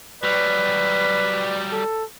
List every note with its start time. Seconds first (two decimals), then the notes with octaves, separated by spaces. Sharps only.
0.23 F#3 G3 B4 D5
1.72 A4